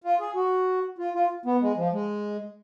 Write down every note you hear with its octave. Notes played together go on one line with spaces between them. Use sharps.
F4
G#4
F#4
F4
F4
B3
G#3
F3
G#3